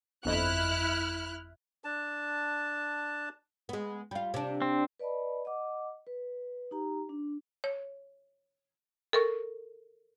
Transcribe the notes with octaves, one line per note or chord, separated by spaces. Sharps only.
G1 F2 E4 D#5 F6 F#6
D4 A5
G#3 B3
G3 F4
C3 D4
C4
B4 D5 D#5 A5 B5
D#5 F#5 D6
B4
D#4 G4 A#5
D4
C#5
A4 A#4 C#6